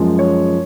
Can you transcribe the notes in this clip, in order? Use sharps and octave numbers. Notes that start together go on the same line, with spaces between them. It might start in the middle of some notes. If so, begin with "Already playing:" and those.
Already playing: F#2 F3 G#3
C#5